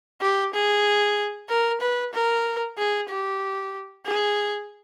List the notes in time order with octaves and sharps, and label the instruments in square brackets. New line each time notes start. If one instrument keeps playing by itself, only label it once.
[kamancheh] G4
G#4
A#4
B4
A#4
G#4
G4
G#4